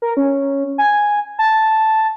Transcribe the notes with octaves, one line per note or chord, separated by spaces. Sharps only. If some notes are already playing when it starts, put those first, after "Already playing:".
A#4
C#4
G#5
A5